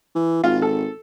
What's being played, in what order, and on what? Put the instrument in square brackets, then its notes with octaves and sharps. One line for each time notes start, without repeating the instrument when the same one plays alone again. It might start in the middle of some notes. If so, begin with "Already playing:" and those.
[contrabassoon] E3
[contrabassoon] G#1 [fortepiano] F4
[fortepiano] A4